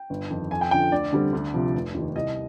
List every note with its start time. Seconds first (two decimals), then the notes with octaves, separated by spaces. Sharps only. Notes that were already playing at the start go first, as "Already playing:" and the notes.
Already playing: G5
0.10 G1
0.30 F2 D#3
0.51 F2 G#5
0.61 G5
0.71 D3 F3 G5
0.92 D2 D5
1.13 D3 G3 C4
1.33 D2
1.54 C3 F3
1.75 F1
1.95 D#2 D#3
2.16 C2 D#5